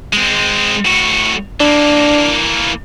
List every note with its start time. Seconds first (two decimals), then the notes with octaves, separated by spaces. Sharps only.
0.13 G#3 C4
0.85 A2 F#4
1.60 E3 A#3 D4